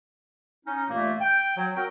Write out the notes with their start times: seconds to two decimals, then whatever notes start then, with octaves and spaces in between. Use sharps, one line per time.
0.65 C#4 D#4
0.89 G2 A#2 E3 A3 A#3
1.21 G5
1.57 F#3
1.76 F#3 C4 F#4 A#4 G5